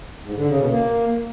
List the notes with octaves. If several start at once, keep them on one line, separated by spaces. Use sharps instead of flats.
G#2
D3
C#3
B2
A#3